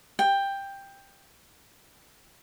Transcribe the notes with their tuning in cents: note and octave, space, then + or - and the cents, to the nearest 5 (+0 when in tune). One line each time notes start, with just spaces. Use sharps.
G5 +10